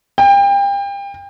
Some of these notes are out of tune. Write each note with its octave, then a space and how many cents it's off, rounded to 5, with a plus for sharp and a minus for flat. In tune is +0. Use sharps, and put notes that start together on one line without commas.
G5 +30